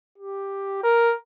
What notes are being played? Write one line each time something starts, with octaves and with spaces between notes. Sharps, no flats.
G4
A#4